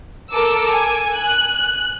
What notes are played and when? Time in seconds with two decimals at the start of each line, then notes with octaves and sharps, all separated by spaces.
0.31 A4 A#4 D6 E6
0.70 G#5
1.16 F#6